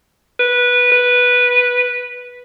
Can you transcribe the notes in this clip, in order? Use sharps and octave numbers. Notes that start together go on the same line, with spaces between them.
B4
B4